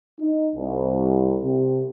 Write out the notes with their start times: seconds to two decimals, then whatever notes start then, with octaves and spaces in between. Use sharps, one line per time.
0.20 D#4
0.56 C2
1.44 C3